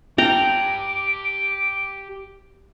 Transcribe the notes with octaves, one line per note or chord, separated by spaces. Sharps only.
G4 G5 A5 A#5 D6